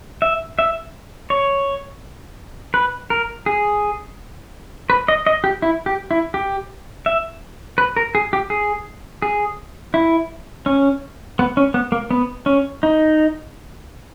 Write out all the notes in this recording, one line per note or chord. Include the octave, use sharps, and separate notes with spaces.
E5
E5
C#5
B4
A#4
G#4
B4
D#5
D#5
G4
E4
G4
E4
G4
E5
B4
A#4
G#4
G4
G#4
G#4
E4
C#4
B3
C#4
B3
A#3
B3
C#4
D#4